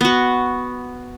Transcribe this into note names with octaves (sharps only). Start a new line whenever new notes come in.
B3 F#4